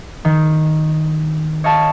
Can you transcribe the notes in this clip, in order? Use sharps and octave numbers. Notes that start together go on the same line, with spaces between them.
D#3
C#5 D#5 F5 A5 C#6